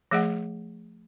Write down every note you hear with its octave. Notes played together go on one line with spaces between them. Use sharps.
F3 A3 G#4 D#5 F#5